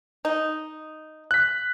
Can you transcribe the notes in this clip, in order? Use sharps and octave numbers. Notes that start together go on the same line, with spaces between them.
D#4
F#6 B6